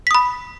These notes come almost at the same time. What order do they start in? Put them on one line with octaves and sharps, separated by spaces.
B6 D#6 B5